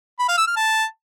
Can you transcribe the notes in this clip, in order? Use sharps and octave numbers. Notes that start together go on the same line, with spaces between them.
B5
F5
E6
F6
A5